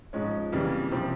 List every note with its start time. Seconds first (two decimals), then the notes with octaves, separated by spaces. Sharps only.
0.13 G#2 F3 G#3 C#4
0.52 F2 C#3 E3 G3 A#3
0.91 C3 F3 C4